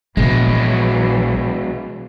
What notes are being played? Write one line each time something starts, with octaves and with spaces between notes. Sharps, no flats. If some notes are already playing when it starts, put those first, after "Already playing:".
A#1 B2 E3 F#3 G#3